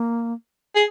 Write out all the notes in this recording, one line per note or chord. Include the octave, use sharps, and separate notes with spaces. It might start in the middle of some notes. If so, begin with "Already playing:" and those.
Already playing: A#3
G#4